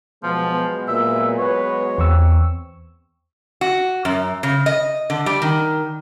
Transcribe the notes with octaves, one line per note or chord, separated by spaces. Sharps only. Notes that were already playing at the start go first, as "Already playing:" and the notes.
B2 F3 F#3 G#3 B3
A#2 E5
B4 C#5
E2 C4 C#6 E6
F#4
F#2
C#3
D#5
D3
G3
D#3